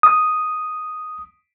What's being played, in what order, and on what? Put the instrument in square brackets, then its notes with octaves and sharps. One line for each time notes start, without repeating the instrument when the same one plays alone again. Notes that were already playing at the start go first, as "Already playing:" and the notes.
[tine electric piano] D#6